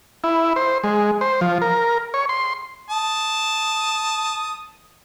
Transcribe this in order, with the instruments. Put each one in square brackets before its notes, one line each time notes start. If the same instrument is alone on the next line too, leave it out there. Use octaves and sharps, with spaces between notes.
[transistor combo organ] E4
C5
G#3
C5
F3
A#4
C#5
C6
[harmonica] A5 D#6